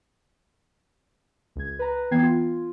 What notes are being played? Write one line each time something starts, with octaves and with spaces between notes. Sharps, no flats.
C#2 G#6
B4 A#5
E3 B3 G5 G#6 C7
F4